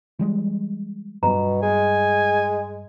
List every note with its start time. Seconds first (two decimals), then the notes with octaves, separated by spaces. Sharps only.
0.19 E3 G3 G#3
1.23 G2 B2 F#3 B3 A#5
1.63 G#3 G#5